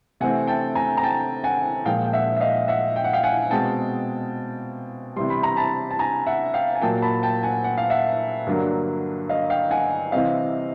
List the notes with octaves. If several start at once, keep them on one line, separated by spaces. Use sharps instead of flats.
C3 E3 A3 C4 F#5 G#5
G5 A5
G#5 A#5
A#5
G5 A5
F#5 G#5
A#2 F3 G#3 F5 G5
G5
E5 F#5
E5
D#5 F5
E5 F#5
G5
F#5
F5 G5
F#5 G#5
B2 G#3 C4 G5 A5
C3 E3 G3 C6
B5
A#5
A5 B5
A5
G#5 A#5
E5 F#5
F5 G5
G#5
A#2 F#3 A#3 G5 A5
A5 B5
G5 A5
F#5 G#5
F#5
F5
E5 F#5
G2 D3 F#3 A#3
D#5 F5
F5 G5
F#5 G#5
C3 E3 G3 C4 D#5 F5